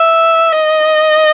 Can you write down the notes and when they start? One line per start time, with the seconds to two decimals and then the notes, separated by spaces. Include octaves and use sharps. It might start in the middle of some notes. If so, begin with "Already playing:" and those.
Already playing: E5
0.52 D#5